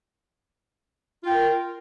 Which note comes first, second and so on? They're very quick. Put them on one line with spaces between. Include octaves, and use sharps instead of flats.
F4 G5 A#4